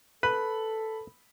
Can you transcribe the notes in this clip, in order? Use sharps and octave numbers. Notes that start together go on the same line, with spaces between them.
A4 B4 B5